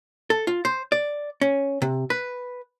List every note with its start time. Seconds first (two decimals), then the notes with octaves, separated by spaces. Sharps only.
0.30 A4
0.47 F4
0.65 C5
0.92 D5
1.41 C#4
1.82 C3
2.10 B4